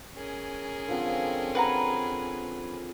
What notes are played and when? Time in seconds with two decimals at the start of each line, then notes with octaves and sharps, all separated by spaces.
0.15 C#4 G#4 A#4
0.88 D3 F3 C4
1.55 B4 F#5 A#5